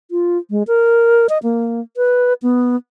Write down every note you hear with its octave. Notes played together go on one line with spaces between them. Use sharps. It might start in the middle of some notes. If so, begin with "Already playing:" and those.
F4
G#3
A#4
D#5
A#3
B4
B3